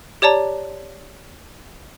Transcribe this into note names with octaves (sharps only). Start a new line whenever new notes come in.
G4 C#5 D5 A5 A#5